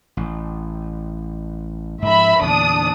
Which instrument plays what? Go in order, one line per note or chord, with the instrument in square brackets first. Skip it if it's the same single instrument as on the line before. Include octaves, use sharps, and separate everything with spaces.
[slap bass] A1
[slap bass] G#2 F3 [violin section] E5 B5
[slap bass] E2 A#2 D3 [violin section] D4 D#6